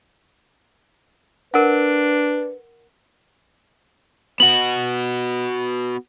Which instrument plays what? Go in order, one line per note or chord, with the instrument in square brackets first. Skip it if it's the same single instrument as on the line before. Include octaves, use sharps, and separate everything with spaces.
[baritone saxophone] D4 [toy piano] A#4 F#5 [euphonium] B4
[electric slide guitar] B3 F#4 [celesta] F#7